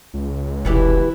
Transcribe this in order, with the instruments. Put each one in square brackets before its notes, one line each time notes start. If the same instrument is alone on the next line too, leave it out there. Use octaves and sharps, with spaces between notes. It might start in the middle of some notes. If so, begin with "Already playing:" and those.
[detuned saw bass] C#2
[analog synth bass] F1 [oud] B2 E3 G4 [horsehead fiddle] E4 B4